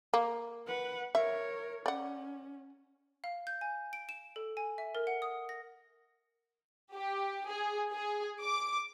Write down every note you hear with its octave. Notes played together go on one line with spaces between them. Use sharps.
A#3
B4 F#5
A#4 C#5 E5
C#4 D5 F#5
F5
G6
G#5
D7
E7
A4
G#5
E5
A#4
F#5
D#6
A#6
G4
G#4
G#4
D6